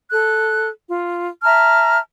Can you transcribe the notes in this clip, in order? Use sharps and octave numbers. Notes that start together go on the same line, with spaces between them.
A4 F#6
F4
E5 A5 A#5 F6